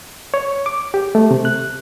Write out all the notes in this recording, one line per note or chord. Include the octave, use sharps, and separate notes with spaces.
C#5
D6
G4
A3
C3
F#6